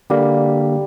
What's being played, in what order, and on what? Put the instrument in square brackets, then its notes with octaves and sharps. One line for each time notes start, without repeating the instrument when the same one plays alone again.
[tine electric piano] D3 A#3 [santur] G3